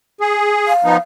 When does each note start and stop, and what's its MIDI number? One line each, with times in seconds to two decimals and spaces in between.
0.21 0.73 68
0.68 0.99 77
0.85 0.97 53
0.85 0.97 59
0.85 0.97 63